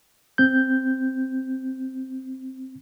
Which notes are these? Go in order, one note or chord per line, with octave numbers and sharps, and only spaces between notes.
C4 G6